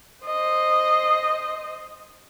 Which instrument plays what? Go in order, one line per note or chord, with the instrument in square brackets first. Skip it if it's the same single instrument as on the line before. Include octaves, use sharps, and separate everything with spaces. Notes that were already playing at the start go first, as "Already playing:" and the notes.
[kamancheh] C5 D#5